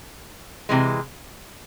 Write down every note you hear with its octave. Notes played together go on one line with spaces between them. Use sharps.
C3 E3 G#3